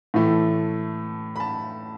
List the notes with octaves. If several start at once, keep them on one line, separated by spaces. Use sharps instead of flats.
A2 E3 A3
B5
A5